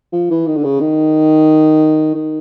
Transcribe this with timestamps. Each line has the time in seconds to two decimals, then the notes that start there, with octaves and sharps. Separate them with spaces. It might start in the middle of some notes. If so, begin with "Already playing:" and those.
0.13 F3
0.31 E3
0.47 D#3
0.56 D3
0.64 C#3
0.80 D#3
2.15 D#3